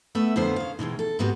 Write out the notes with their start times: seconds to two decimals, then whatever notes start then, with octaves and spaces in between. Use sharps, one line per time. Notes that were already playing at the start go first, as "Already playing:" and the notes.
0.15 A3 B3 B4 E5
0.36 F2 A#2 D3 F3 B3 C5
0.56 C#3 F5
0.79 B2 D#3 E3 G#3
0.99 A4
1.19 G#2 C3 G3 B3 F#4